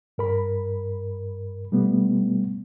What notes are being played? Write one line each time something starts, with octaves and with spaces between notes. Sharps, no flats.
G2 A#4 B5
B2 G3 A3 B3